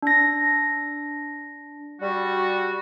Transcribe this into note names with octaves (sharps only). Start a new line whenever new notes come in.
D4 A#6
G3 F#4